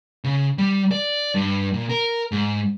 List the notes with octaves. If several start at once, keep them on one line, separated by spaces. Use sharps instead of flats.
C#3
G3
D5
G2
A#2
A#4
G#2